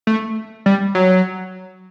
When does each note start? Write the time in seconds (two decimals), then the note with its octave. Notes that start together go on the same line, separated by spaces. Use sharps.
0.07 A3
0.66 G3
0.95 F#3